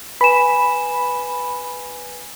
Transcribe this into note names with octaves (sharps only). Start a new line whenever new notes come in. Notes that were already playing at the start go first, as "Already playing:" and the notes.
B4 G#5 B5 E7